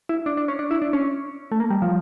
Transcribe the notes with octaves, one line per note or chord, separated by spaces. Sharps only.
E4
D4
D4
C#4
D4
E4
D4
C#4
A3
A#3
G3
F3